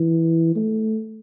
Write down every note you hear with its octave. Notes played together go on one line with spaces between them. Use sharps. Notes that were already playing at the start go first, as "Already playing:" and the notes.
Already playing: E3
A3